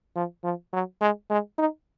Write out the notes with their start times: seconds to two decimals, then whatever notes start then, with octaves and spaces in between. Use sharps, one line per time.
0.16 F3
0.44 F3
0.73 F#3
1.01 G#3
1.30 G#3
1.58 D#4